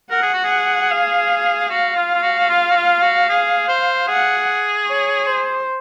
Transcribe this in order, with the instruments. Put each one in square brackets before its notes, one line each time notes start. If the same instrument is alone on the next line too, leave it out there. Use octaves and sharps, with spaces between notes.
[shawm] A#4 [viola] F#5
[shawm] G#4
F#4
G#4
[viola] F5
[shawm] F#4 [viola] F5
[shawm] F4
F4
F#4
F#4
F4
F#4
F4
F#4
G#4
C5
[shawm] G#4 [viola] F#5
[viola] C#5
C5